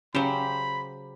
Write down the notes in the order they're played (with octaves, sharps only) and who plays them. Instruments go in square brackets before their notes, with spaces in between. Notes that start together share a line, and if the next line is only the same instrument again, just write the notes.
[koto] C#3 F#3 [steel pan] C#4 [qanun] G4 C5 [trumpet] B5